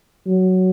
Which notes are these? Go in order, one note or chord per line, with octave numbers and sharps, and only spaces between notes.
F#3